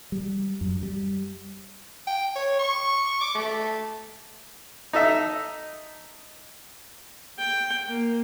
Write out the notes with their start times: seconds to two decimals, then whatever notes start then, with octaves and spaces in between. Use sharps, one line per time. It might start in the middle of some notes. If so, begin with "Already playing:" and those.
0.12 G3
0.61 F#2
0.83 G3
2.07 G5
2.36 C#5
2.59 C#6
3.21 D6
3.35 A3
4.93 D#4 A4 E5
7.38 G5
7.88 A#3